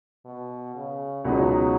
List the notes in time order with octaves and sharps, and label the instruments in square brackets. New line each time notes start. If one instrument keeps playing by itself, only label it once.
[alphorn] B2
C#3
[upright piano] C#2 B2 G#3 B3 D#4 [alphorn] F#3